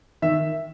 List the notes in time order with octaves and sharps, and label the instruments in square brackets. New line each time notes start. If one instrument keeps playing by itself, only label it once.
[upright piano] D#3 E5